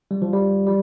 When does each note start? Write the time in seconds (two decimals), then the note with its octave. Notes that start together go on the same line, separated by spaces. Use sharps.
0.11 G3
0.22 F3
0.33 G3
0.67 G3